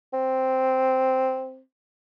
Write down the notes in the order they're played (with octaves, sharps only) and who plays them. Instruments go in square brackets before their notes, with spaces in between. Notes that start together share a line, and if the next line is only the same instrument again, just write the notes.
[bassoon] C4